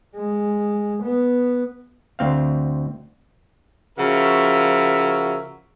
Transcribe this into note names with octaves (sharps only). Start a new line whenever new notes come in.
G#3
B3
D2 C4 F5
C#3 F3 F#4 A#4 E5